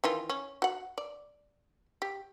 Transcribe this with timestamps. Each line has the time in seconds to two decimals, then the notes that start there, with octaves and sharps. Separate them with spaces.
0.04 D#3 E3 F4
0.29 C#4
0.62 F#4 F#5
0.98 D5
2.02 G4